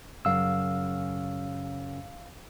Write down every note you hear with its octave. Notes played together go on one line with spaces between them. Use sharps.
F#2 C#3 F5 E6